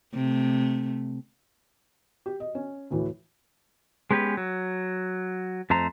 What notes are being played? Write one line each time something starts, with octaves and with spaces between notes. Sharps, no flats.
C3 A3
G4
D#5
C#4
D2 A2 E3
G#3 B3 C#4 G4 B4
F#3
F2 A3 C5 A#5